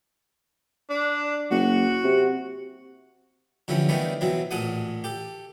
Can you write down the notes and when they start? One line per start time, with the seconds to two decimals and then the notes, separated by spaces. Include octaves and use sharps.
0.90 D4
1.51 F#1 F#4
2.04 C3
3.68 D3 E3 F3 G3 C#4
3.89 D#3 E3 G3 A3 B3 D4
4.21 B2 E3 F#3 C4
4.51 A1 A#2 G#4 A4 F#5 D#6
5.04 G4 A4